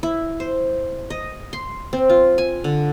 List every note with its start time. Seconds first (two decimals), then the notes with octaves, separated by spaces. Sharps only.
0.03 E4
0.40 C5
1.10 D#5
1.53 C6
1.93 C4
2.10 F4
2.38 G#5
2.64 D3